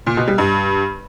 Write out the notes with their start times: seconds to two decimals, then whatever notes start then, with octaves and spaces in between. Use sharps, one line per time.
0.07 A#2
0.17 B2
0.28 G3
0.38 G2